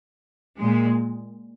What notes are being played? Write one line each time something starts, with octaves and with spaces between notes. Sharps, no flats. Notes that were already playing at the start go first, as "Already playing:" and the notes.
A#2 G#3